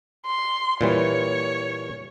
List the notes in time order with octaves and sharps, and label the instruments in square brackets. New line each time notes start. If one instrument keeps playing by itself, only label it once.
[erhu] C6
[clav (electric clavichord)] A#2 E3 G3 [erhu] C#5